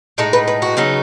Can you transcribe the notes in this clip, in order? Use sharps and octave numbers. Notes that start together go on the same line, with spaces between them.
A2 G#3 D#4 A4
B4
B4
F#4
C#3 F#3 B3 D#4